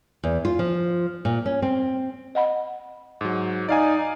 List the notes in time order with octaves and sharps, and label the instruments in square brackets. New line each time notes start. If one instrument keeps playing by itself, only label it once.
[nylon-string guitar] E2
F4
F3
A#2
C#4
C4
[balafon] D#5 F#5 B5
[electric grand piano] G#2 F#3
[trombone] D#4 [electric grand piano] D5 F5 G#5